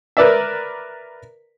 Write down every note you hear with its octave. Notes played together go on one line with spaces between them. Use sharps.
A#4 B4 D5 E5